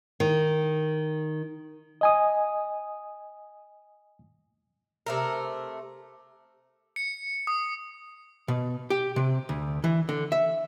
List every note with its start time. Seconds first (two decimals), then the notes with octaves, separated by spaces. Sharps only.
0.20 D#3
2.01 D#5 G#5 D#6
5.06 C3 A3 A#4
6.96 C#7
7.47 D#6
8.48 B2
8.90 G4
9.16 C3
9.49 D2
9.84 E3
10.09 D3
10.32 E5